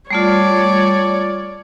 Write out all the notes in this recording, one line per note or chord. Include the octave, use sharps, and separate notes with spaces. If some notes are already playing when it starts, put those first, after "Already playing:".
G3 A3 F4 C#5 D5